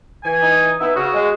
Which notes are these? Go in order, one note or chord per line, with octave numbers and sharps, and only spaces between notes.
E3 G#5
D#4
B3 D#4 E4 E5
C#3 F#4
G#3